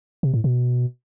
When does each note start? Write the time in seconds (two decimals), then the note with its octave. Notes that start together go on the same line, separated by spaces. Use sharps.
0.23 C3
0.34 A2
0.44 B2